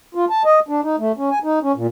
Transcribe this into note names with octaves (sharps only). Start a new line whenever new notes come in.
F4
A5
D#5
D4
D#4
A3
C#4
G#5
D#4
C#4
A#2